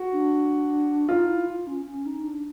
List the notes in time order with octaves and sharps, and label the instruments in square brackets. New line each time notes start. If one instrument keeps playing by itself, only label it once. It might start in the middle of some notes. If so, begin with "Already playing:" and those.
Already playing: [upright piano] F#4
[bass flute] D4
[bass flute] D#4 [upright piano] F4
[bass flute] E4
F4
C#4
C#4
D#4
D4